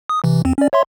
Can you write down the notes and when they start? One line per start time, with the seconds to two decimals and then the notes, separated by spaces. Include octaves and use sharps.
0.09 D#6
0.24 C3 E3
0.45 E2 C4
0.58 C#4 D5
0.73 C#5 E5 C6